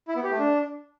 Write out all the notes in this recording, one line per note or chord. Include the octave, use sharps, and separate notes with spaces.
E4
B3
G4
A3
D4